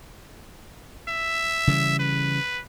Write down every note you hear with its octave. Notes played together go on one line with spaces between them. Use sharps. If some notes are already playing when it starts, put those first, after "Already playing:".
E5
C#3 E3 G3
B4